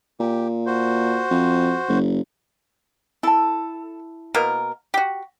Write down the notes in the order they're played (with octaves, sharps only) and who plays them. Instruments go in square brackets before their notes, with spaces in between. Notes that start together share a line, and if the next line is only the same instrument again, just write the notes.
[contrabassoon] A#2 [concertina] G4
[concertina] F#4 C5
[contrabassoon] F2
F#1
[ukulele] E4 A5 [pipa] A4
[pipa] B2 A#3 A#4
F#4 G4